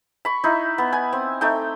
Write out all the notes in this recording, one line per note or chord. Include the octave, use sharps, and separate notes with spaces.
B5 C#6
D#4 E4
B3
G#5
C4
A3 D#4 G5